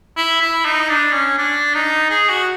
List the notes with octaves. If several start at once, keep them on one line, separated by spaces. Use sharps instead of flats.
E4
E4
D#4
D4
C#4
D4
D#4
G#4
F#4